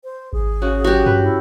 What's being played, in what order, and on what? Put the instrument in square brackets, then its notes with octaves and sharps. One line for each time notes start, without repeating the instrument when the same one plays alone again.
[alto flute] C5
[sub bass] G#1 [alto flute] G#4
[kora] C#3 F#4
[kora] F#3 [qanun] F#4 G4
[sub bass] G2 [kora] B4
[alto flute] E4